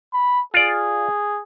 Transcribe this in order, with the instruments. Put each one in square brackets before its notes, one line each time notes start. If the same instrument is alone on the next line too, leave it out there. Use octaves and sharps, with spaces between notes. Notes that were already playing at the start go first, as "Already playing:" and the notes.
[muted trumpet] B5
[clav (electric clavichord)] F4 D5 [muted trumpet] G#4